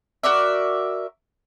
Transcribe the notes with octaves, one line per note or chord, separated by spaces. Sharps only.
F#4 A#4 D5 E5